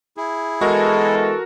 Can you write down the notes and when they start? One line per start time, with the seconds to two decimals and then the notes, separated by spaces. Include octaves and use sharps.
0.17 E4 G#4
0.61 E3 G#3 B3 F#4 A4 A#4